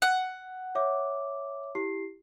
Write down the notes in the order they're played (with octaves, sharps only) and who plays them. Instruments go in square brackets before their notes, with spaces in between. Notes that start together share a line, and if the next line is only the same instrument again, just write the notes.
[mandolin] F#5
[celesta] C#5 E5 D6
E4 G4 C7